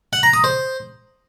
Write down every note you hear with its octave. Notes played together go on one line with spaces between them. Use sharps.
F#5
A#5
D#6
C5